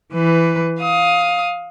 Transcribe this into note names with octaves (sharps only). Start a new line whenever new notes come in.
E3 B4
F5 D#6